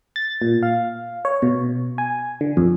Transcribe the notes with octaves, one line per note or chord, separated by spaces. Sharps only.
A6
A#2
F5
C#5
B2
G#5
D3
F2